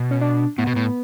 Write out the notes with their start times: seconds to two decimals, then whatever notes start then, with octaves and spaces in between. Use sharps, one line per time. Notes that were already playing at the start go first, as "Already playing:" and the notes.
Already playing: B2
0.11 C#4
0.21 D4
0.58 A2 B3
0.67 B2
0.76 A2